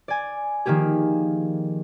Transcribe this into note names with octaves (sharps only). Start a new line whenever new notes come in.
D5 G#5
D#3 F3 A#3 G4 G#4